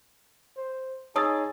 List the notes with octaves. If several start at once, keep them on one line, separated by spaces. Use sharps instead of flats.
C5
D#4 G#4 C#5 A5 D#6 E6 A6